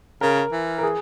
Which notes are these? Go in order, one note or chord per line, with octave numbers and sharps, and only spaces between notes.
C#3 A#4
E3
A#4
G#4